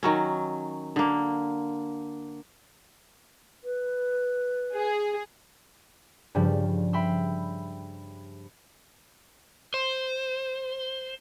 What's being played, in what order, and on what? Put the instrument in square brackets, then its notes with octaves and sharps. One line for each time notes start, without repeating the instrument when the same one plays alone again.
[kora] D#3 F#3 C#4
D3 A#3
[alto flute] B4
[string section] G#4
[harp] G2 C#3 F3 G3
E5 G5 B5 C6 E6
[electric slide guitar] C5